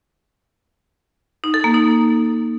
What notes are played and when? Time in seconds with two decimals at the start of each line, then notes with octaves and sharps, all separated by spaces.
1.44 D#4
1.54 A4
1.64 A#3
1.74 D#4